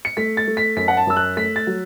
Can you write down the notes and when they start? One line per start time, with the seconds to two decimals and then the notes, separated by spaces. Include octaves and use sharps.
0.05 C#7
0.17 A3 B6
0.37 A6
0.47 A3
0.57 B6
0.77 F#2 B6
0.88 F#5
0.97 A5
1.07 F#2 E6
1.17 F#6
1.37 A3 B6
1.56 A6
1.67 F#3